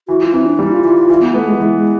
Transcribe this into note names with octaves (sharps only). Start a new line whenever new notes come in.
E3 F#4
F4
E3 C4
D4
G3 D#4
F4
E3 F4
F4
E3 F4
B3
A3 B3
G#3
E3 G#3
G#3